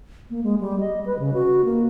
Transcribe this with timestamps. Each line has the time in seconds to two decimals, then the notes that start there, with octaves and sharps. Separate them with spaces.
0.30 A#3
0.44 G#3
0.61 G3
0.80 D#5
1.06 B4
1.19 C#3
1.34 F#4
1.65 A#3